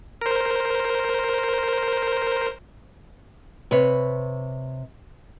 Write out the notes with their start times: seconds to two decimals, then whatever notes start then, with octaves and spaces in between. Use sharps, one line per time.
0.22 A#4 C5
3.71 C3 B4 C#5